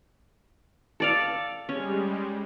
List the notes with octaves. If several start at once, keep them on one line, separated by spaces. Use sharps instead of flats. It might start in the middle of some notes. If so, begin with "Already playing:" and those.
A4 D5 F5
G3 G#3 C#4